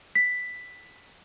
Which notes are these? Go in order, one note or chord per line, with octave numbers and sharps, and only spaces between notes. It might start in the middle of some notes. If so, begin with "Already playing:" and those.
B6